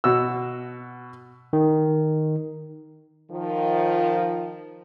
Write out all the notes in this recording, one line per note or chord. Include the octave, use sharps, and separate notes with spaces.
B2 F#4 E6
D#3
D#3 F3